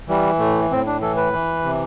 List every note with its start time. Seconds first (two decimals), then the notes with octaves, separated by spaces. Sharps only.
0.09 E3 G3
0.39 A2 A3
0.71 A2 C4
0.86 D4
1.01 E3 A4
1.17 B4
1.33 E3
1.63 C3